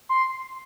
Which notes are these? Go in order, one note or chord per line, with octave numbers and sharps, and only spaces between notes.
C6